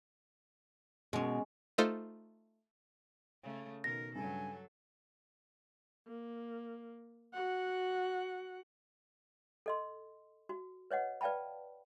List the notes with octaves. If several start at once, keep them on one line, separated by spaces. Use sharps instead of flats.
B2 G#3 C#4
A3 D#4 F4 A4 C5
C#3 A3
B2 D#3 A#4 A#6
G2 C#3 F#3 G3 A4 G#5
A#3
F#4 F#5
A4 D#5 C6
F#4
B4 C#5 D#5 F#5
B4 D5 F5 G5 A5 B5